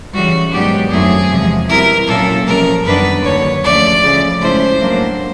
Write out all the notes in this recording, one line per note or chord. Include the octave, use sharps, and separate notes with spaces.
C#3 E3 G3 F#4
G#2 D#3 F#3 B3 D4 G4
F#2 D#3 F#3 A3 C4 G#4
E2 C3 F3 G#3
B2 G3 C4 E4 A#4
A#2 F#3 A#3 C#4 E4 A4
C3 F3 G#3 C#4 A#4
F#2 D#3 G3 B3 D4 B4
D#2 D3 F#3 C#5
D2 C#3 F3 A3 D5
C#3 F3 A3
G#2 F3 A3 C#4 E4 C5
A2 F#3 A#3 D4